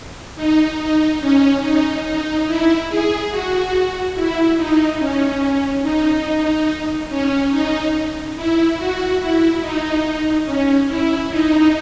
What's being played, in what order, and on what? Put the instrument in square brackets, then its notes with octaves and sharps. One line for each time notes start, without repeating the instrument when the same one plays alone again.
[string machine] D#4
D#4
C#4
D#4
D#4
E4
G#4
F#4
E4
D#4
C#4
D#4
C#4
D#4
E4
F#4
E4
D#4
C#4
E4
D#4